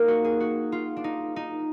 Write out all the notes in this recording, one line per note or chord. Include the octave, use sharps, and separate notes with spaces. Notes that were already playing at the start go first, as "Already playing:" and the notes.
Already playing: A#3 D#4
F#4
G#4
F#4
F4
D4
D#4
D#4